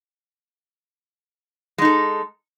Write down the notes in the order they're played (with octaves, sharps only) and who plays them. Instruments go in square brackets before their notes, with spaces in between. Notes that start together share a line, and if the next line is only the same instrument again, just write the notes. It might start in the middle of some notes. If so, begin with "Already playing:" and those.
[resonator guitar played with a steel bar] G#3
D#4
A4